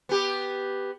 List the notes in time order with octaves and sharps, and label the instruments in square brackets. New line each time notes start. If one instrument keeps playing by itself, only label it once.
[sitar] B3 G4